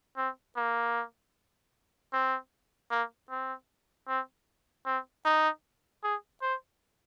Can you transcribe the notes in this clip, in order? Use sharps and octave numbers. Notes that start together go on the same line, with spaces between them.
C4
A#3
C4
A#3
C4
C4
C4
D#4
G#4
C5